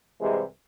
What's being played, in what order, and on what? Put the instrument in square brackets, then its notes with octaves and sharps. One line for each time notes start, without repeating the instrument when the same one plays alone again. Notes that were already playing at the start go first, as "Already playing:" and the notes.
[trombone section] C2 C3 E3 G#3